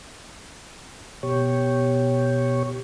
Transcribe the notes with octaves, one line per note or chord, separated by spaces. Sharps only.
B2 G4 C#5